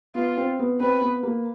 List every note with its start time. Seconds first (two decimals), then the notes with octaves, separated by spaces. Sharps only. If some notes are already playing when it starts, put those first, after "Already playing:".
0.15 B3 F4
0.37 C4
0.59 B3
0.80 C4 B4
1.01 B3
1.23 A#3